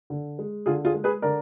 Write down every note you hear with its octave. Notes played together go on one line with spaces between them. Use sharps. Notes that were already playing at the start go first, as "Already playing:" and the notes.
D3
G#3
D3 F4 G#4
F4 G#4
G#3
G#4 B4
D3 A#4 D5